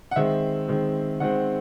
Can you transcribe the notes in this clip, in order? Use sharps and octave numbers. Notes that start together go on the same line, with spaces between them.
F#5
D#3 G#3 C4 E5
D#3 G#3 C4
D#3 G#3 C4 F#5